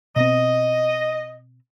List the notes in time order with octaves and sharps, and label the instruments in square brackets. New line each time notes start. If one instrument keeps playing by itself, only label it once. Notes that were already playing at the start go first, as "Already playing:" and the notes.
[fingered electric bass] B2 B3 C4 [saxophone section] D#5